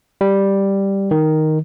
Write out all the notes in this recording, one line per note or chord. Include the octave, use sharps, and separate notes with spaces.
G3
D#3